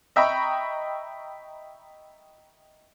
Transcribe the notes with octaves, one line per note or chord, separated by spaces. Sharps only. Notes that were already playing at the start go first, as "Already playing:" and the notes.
D#5 E5 G5 A#5 B5 C#6